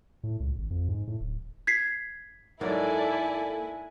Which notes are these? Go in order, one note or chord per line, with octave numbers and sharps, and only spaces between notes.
A2
C#2
G#1
F2
G#2
A2
D1
G#6 B6 C7
G#2 F#3 A#3 E4 A4 D5 G#5